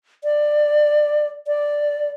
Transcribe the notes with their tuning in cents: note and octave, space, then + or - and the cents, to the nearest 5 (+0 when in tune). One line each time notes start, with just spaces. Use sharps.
D5 +20
D5 +0